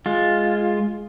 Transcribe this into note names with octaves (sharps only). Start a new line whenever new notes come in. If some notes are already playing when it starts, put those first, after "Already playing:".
G#3 F4